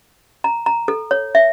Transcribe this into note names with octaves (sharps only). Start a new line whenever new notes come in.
A#5
A#5
A4
C#5
E5